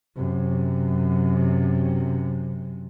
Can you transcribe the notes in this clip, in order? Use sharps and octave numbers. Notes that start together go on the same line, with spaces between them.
F#2 C3